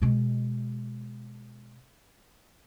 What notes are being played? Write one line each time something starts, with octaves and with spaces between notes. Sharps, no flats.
B2 G#3